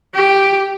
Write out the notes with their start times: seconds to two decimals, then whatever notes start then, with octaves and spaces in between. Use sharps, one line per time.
0.15 G4